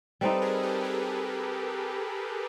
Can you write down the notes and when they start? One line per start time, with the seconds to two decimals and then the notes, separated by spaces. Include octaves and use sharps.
0.21 G3 C4 D#4 A4 B4
0.42 G#4 A#4
0.63 G4 A4
0.84 A4 B4
1.04 G#4 A#4